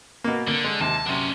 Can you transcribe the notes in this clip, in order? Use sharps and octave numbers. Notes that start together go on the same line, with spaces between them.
B2 A#3
D3 A#3
G#3
D#2 C3 A5
F#2 C3 C#4 D4